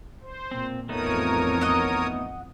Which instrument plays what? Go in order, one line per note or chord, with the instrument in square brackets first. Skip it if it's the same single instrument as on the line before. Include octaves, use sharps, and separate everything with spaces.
[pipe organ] C5
[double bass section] A#2 [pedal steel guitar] C4
[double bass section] A1 F2 [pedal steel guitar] A3 B3 D#4 [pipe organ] A#4 C#5 D#6
[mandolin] D#5 F#5